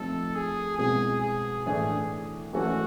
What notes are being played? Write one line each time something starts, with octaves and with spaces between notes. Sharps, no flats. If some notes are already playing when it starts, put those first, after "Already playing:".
Already playing: F3 A3 C4 D#4 A4
G#4
B2 G#3 C4 E4 G#4
G#4
A2 E3 A3 D4 G#4
E3 A3 C#4 E4 F#4 A4